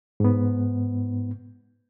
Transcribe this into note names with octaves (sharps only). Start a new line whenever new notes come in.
G#2 B3